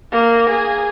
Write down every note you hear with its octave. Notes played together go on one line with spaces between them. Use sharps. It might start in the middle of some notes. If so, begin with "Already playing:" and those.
A#3
G#4